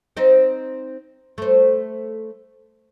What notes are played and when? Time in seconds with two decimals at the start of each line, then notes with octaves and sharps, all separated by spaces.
0.17 C4 D#4 C5
1.38 A3 C5